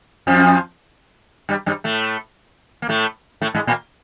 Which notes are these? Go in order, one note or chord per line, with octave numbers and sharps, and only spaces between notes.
F2 F3
G2 G3
G2 G3
A2 A3
A#3
A2 A3
A2 A3
G#2 G#3
A#2 A#3